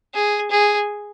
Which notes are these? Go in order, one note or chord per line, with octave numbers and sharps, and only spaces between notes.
G#4
G#4